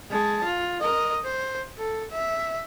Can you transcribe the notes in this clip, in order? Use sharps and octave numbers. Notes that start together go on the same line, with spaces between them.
G#3 A5
F4
A#4 D#5
C5
A4
E5